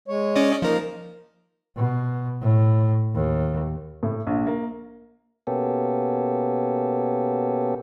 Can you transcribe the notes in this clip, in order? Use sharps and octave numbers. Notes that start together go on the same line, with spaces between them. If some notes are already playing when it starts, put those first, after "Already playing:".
G#3 C#5
C#4 D5 D#5
F3 A#3 D#4 A#4
B2
A2
D#2
A2
A#1
A#3
B2 A#3 B3 C#4 G4 A4